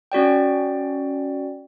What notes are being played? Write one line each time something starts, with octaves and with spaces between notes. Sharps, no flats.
C#4 F#4 D5 G5